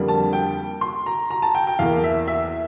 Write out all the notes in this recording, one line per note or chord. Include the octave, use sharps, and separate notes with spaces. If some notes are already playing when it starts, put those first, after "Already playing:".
Already playing: F2 D3 G3 A#3
A5
G5
C6
A#5
A#5
A5
G5
G5
E2 E3 A#3 F5
E5
E5